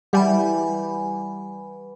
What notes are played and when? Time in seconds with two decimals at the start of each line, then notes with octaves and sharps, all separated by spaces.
0.13 E3 G3 F#5 G#5 B5